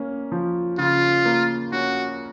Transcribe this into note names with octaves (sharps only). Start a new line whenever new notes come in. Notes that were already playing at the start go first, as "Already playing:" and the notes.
Already playing: A#3 C#4
F3
C#3 F4
A#3
C#4 F#4